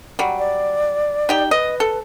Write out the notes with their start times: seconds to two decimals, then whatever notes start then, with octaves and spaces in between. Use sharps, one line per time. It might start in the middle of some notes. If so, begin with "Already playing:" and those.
0.19 F#3 G3
0.39 D5
1.29 D#4 G4 G5
1.51 B4 D#5
1.80 A4